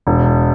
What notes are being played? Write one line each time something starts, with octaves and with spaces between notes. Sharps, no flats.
E1